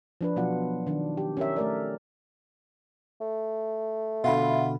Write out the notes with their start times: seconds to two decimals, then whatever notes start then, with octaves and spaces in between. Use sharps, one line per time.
0.21 F3 D4 B4
0.36 B2 F3 F#3 B3 F4 F#5
0.87 D#3 D4
1.17 G4
1.37 C#4 E4 G4 A#4 C#5 E5
1.56 A3 A#4 D5
3.20 A3
4.24 B2 D3 F4 E5 F#5 B5